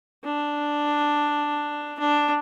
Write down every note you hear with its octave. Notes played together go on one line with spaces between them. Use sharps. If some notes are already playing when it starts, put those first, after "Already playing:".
D4
D4